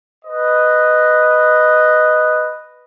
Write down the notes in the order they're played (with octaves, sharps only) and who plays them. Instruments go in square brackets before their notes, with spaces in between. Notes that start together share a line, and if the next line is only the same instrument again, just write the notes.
[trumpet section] B4 D#5